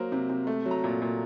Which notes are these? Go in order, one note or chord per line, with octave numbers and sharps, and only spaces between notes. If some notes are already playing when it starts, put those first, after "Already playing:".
Already playing: F#3 A#3 C5
C3
C3
A3
F#3
A#5
A#2
A#2